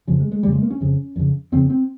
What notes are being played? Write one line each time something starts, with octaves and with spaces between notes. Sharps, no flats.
F2 C#3 F3
G#3
G#3
F2 C#3 G3
G#3
A#3
C#4
F2 C#3
F2 C#3
F2 C#3 C4
C4